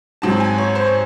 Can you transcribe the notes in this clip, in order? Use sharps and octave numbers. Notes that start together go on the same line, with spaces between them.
G#2 F#3 C4 A5
G#5
C#5
C5